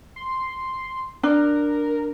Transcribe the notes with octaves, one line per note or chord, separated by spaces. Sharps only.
C6
D4 A#4